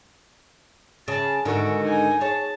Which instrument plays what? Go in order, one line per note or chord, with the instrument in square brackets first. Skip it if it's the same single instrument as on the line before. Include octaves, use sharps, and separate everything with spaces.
[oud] C#3 [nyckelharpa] A5
[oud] G#2 D3 D#3 [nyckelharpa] F#4
[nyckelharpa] D#4 G#5
[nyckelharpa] G#4 A5 [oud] C#5